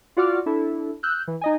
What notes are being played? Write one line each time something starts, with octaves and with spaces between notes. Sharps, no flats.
F4 F#4 D5 F#5 D6 F6
D4 E4 A4
E6 F#6 G6
E3
D#4 D#5 G#5